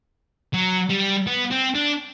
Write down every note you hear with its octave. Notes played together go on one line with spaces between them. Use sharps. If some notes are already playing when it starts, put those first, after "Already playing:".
F#3
G3
B3
C4
D4